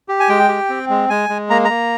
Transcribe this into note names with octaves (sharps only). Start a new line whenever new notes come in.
G4
G#5
G#3 G5
G4
C4
G#3
G#3 G#5
G#3
A#3 A#5
A#3 A#5